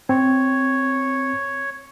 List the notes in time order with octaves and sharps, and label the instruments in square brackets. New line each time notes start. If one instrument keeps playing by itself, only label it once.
[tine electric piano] C4 [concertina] C#5